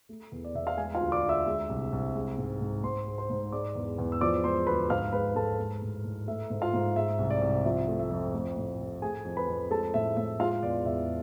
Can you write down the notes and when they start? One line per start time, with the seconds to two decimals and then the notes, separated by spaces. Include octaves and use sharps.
0.09 A3
0.32 E2
0.45 D5
0.55 E2 E5
0.67 F5
0.77 G#3 G#4 G#5
0.95 F4 F5
1.00 D2
1.12 D5 D6
1.23 D2
1.29 E5 E6
1.47 G#3
1.69 C2
1.93 C2
2.15 G#3
2.38 G#2
2.61 G#2
2.84 G#2 C5 C6
3.07 G#3
3.18 C5 C6
3.30 G#2
3.52 G#3 D5 D6
3.75 E2
3.98 E2
4.12 E6
4.21 F3 D5 D6
4.44 G#3 C5 C6
4.67 D2 B4 B5
4.90 G#2 F5 F6
5.12 G#3 B4 B5
5.35 G#2 A4 A5
5.59 G#3
5.82 A2
6.04 A2
6.27 A3 E5
6.50 G#2
6.61 F4 F5
6.73 G#2
6.96 G#3 E5
7.19 C2
7.30 D5
7.41 C2
7.65 F3 E5
7.88 A3
7.99 E5
8.11 F2
8.34 A3
8.56 A2
8.79 A2
9.02 A3 G#4 G#5
9.25 F2
9.37 B4 B5
9.48 F2
9.71 G#3 A4 A5
9.94 A2 E5
10.17 A2 E5
10.40 G#3 F4 F5
10.63 E2 D5
10.86 E2 E5